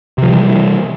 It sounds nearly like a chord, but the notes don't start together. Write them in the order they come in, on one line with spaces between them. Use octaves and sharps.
C3 F3 G3 E3